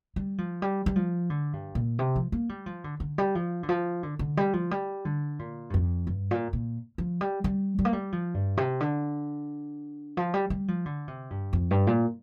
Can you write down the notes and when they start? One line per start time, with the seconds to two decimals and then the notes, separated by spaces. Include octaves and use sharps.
0.16 G3
0.38 F3
0.62 G3
0.86 G3
0.96 F3
1.30 D3
1.53 G2
1.75 A#2
1.99 C3
2.16 F3
2.32 A#3
2.49 G3
2.66 F3
2.84 D3
3.00 D3
3.18 G3
3.35 F3
3.63 D3
3.69 F3
4.03 D3
4.19 D3
4.37 G3
4.53 F3
4.71 G3
5.05 D3
5.39 A#2
5.70 G2
5.74 F2
6.07 G2
6.31 A#2
6.53 A#2
6.98 F3
7.21 G3
7.44 G3
7.79 G3
7.85 A#3
7.93 G3
8.12 F3
8.34 G2
8.57 C3
8.80 D3
10.17 F3
10.34 G3
10.50 G3
10.68 F3
10.86 D3
11.08 C3
11.30 G2
11.53 F2
11.71 G2
11.87 A#2